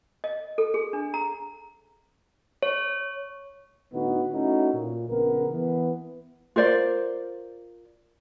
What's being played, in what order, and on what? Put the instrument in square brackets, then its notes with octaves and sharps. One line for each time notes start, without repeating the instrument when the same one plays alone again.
[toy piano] D#5
A4
G#4
D4
A#5
[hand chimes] C#5
[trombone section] A2 D3 B3 D#4 F#4
A3 C#4 D#4 E4 F#4
A#2
A#1 C#3 B3 A#4
E3 B3
[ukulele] F4 A#4 C5 D5